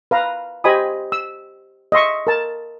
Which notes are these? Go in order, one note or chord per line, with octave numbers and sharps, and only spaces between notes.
B4 F5 A#5
G4 C5 D#5 G#5 B5 D#6
E6
D#5 E5 C6 C#6
A#4 A5